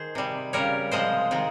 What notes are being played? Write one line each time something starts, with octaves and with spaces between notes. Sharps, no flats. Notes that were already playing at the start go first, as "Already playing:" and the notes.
Already playing: D#3 G#4 C5
C3 G3
C#3 G3 A#4 C#5
C3 F3 G#3 C5 D#5
C3 D#3 G#3